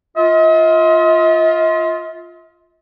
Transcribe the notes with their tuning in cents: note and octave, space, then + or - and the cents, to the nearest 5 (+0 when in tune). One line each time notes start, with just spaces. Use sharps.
F4 +0 D#5 +45